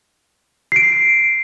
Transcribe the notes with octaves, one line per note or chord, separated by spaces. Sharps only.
C7 D7